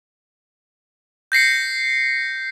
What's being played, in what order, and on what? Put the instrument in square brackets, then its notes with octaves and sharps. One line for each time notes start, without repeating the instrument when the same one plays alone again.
[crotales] G6 A#6 C7 C#7